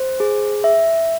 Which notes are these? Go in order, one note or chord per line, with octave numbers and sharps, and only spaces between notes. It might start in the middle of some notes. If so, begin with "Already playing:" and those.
Already playing: C5
G#4
E5